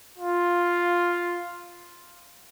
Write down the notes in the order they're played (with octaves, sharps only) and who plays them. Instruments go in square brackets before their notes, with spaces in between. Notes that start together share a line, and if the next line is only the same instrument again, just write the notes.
[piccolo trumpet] F4